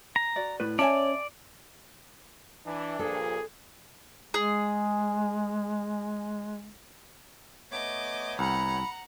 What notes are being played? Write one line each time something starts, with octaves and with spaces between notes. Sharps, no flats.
A#5
F#4 D5
A2 B4
C#4 C#5 D5 E5 G#5 A5
E3 D4
G2 A#2 F3 G#4 A4
G#3 G#4
A3 B3 C#5 D#5 D6
C2 F#5 A#5 B5